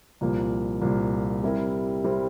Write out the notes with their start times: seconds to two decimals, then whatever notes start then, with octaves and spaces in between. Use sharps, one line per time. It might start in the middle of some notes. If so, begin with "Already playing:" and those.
0.21 C2 A#2 F3 A#3
0.82 C2 A#2 F3 A#3
1.43 C3 G3 C4 E4 A#4
2.03 C3 G3 C4 E4 A#4